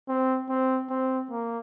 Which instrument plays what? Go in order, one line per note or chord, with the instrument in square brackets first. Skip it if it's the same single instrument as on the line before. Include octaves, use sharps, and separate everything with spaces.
[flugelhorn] C4
C4
C4
A#3